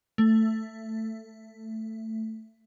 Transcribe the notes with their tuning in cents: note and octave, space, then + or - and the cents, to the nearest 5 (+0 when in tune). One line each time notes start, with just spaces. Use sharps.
A3 +10